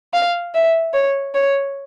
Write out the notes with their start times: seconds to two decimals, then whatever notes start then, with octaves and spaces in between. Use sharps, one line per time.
0.13 F5
0.55 E5
0.94 C#5
1.35 C#5